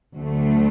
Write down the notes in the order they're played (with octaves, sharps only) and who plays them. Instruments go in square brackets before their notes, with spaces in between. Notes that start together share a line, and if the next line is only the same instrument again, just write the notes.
[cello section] D2 D3 F#3 A3